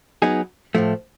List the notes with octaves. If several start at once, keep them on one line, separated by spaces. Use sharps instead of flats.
F#3 B3 D#4 G#4
A2 F3 A3